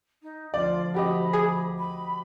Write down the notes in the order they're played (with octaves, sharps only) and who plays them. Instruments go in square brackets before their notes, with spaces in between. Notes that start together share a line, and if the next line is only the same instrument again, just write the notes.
[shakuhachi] D#4
[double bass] D2 F3 [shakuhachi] F4 [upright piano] D5
[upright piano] F#4 G4 D#5 [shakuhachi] B5
[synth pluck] G#4
[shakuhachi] B5